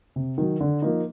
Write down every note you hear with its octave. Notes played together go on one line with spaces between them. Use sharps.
C3
D#3 F#3
D3
F3 A#3 D#4